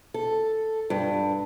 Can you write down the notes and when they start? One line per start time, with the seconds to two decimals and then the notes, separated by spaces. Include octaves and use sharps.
0.14 A4
0.90 G2